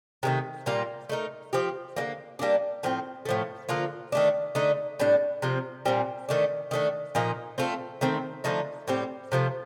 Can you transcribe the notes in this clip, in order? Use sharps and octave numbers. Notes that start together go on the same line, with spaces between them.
C3 D#3 A3
A#2 G3 A#3 F4
A3 D#4 A#4
F3 C4 G4
D3 G3 A#3
G3 A#3 D4
A2 F3 C4
A2 F3 A3
D3 F3 A#3 F4
D#3 A3 D4
D3 A3 D#4
A2 G3 D4
C3 F3 C4
A#2 G3 C4
D#3 A3 D4
D#3 A3 D4
A#2 F3 A#3 D#4
A3 C4 F4 A4
D#3 A3 C4
D3 F3 A3 D#4
A2 G3 C4 G4
C3 F3 A3